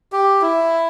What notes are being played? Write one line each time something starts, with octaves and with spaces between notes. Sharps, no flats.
G4
E4